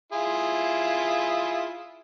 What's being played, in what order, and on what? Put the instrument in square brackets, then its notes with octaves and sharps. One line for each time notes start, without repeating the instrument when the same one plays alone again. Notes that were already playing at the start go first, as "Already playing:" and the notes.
[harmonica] E4 F4 G#4